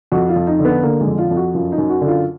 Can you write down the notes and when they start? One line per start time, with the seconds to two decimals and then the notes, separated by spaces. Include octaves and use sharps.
0.12 F2 F#4
0.29 F4
0.36 F2
0.47 D#4
0.59 D3
0.65 B3
0.83 D3 A#3
1.01 G#3
1.07 F2
1.18 F4
1.31 F2
1.36 F#4
1.54 F#2 F4
1.72 D#4
1.78 F#2
1.90 F#4
2.01 D3
2.08 F4